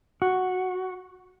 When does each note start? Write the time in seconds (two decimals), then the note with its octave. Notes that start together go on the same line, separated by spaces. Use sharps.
0.22 F#4